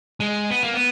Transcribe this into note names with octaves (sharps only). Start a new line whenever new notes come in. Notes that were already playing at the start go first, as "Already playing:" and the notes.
G#3
B3
A#3
B3